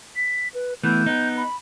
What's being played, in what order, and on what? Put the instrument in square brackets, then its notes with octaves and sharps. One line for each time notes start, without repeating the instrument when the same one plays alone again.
[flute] B6
B4
[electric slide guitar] E3 A3 B3 [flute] G6
[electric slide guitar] B3 D#4
[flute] B5